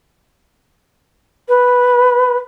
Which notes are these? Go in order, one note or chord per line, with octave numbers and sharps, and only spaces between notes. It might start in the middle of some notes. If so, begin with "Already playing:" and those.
B4